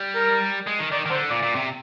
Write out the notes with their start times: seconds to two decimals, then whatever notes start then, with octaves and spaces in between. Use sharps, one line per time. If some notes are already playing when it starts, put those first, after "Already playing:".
Already playing: G3
0.15 A#4
0.67 G#3
0.79 D#3
0.92 D#3 D5
1.06 D#3
1.10 D3 C5
1.30 A#2 D5
1.43 A#2
1.55 C3